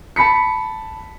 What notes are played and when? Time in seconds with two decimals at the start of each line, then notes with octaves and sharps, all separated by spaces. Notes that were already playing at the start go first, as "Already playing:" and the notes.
0.16 A5 B5 B6 C#7